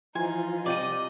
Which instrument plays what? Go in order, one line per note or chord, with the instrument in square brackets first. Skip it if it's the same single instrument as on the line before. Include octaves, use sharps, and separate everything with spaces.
[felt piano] E3 [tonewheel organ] F3 F4 [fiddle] D#4 [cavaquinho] G#5
[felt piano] C2 D#7 [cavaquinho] D5 G5 [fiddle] D#5